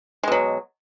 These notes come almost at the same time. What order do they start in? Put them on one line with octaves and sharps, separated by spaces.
G#3 B2 F#3